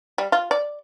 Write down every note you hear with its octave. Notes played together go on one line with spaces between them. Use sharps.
G3
F4
D5